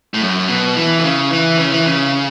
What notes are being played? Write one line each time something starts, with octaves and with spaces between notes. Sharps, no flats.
A2
F#2
B2
E3
B2
C#3
E3
C#3
E3
C#3